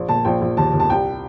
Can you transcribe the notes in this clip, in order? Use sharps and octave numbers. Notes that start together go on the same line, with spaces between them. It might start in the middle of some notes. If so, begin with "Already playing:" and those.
Already playing: A#1
A#2 A5
A#1 G5
A#1
D#2 A5
D#2
A5
C2 G5